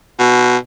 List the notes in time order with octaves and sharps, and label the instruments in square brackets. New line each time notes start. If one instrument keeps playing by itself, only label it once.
[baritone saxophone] B2